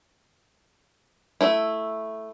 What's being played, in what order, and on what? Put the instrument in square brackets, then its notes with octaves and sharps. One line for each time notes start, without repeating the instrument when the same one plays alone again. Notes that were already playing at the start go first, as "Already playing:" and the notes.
[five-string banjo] A3 E4